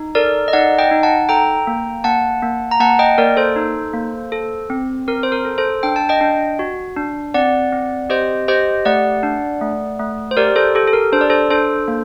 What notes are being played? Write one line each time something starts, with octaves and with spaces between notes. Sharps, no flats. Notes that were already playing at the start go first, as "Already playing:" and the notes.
Already playing: D#4
A4 A#4 D5
D#5
D#4 D5 F#5
D#5 G5
D#4
F#5 A5
A4 G5 A#5
A#3
A#3 F#5 A5
A#3
A#5
A#3 F#5 A5
D#5 G5
A#3 A#4 D5
A4 C5
D#4
A#3
A4
C4
C4 A#4
C5
A#4
A4
A4 C5
D4 G5
A5
D#5 G5
D4
F#4
D4
C4 D5 F#5
C4
G4 C5 D#5
G4 C5 D#5
A3 D5 F#5
D4
A3
A3
C5
G4 A#4 D5
A4 C5
G4 A4
A4
A#4
D4 C5
D5
A4 C5
D4 A4 C5
A#3